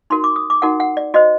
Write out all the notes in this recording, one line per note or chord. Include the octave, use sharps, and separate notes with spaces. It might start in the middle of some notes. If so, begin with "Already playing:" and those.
D#4 F#4 A#4 C6
D6
D#6
D6
D#4 F#4 A#4 F#5
F#5
D5
F#4 C5 D#5